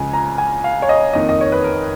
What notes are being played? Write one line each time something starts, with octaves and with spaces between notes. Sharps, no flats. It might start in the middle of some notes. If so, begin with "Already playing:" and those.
Already playing: C#2 C#3 F3 G#5
A#5
G#5
F5
C#5
D#5
F#1 F2 D#3 D#5
D#5
C#5
B4
A#4